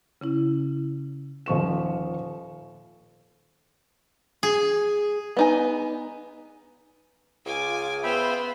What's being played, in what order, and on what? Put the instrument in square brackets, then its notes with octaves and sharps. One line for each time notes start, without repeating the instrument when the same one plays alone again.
[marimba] C#3 C#4 E4
[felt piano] D#1 F3 C#6 E7
[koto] G#4
[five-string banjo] B3 D#4 G#5
[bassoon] C#2 [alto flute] F4 [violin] G#5 D6
[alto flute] B3 [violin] F4 C5 [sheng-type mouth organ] E5 G5 B5